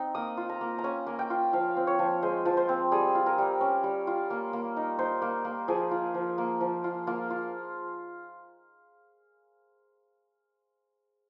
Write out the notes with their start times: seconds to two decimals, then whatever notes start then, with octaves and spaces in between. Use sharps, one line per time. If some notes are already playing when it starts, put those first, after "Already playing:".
Already playing: C4 D#4
0.15 A#3 D#6
0.37 F4
0.49 A#5
0.61 A#3
0.78 A#5
0.84 C#4 G#5
1.07 A#3
1.19 G5
1.30 F4
1.53 F3 F5
1.77 C4
1.87 C#5
1.99 F3
2.22 G#3 C5
2.45 F3
2.57 C5
2.69 C4
2.92 G3 G#4
3.15 F4
3.26 A#4
3.38 G3
3.61 C#4
3.84 G3
4.07 F4
4.30 A#3
4.53 A#3
4.77 D#4
4.98 D#4 C5
5.22 A#3
5.45 A#3
5.68 F3 G#4
5.91 F4
6.14 F3
6.38 A#3
6.61 F3
6.84 F4
7.07 A#3 F4
7.30 F4